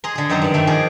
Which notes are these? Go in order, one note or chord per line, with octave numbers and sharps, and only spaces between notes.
G#4 D#5 A#5 C6
D3 G#4
F#2 D#3 F#3 C5 A#5 C6
G2 D5
D#3 G3 A3
F3 G#4 A#4 D5